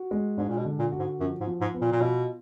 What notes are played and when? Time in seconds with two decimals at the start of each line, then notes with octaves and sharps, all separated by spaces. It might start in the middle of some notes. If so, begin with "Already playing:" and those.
Already playing: F#4
0.11 G#3
0.38 G#2 D4
0.49 A#2
0.58 B2
0.65 D3
0.79 A#2
0.92 F#4
0.99 G#2
1.20 F#2 F3
1.40 G#2
1.47 F3
1.61 G#2
1.74 B3
1.81 A#2
1.92 A#2
2.01 B2 F4